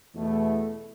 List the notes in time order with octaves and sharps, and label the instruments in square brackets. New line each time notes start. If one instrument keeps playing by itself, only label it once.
[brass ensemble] E2 B2 A3